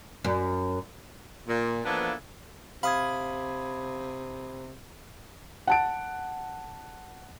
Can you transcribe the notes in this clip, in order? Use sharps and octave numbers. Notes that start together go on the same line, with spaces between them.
F#2
A#2
E3 F3 A#3 B3 D4 A4
C3 F5 B5 D#6 G#6
F#5 A5 D7